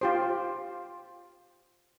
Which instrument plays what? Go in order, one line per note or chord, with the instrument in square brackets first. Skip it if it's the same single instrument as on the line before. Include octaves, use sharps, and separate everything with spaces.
[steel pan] F4 G4 C5